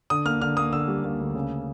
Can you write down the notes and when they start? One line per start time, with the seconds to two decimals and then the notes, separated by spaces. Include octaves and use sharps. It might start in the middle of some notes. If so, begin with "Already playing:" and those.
0.10 D3 D#6
0.25 A#3 F6
0.41 D3 F6
0.57 A#3 D#6
0.72 D3 E6
0.88 G3
1.04 A#3
1.20 D2
1.35 C#3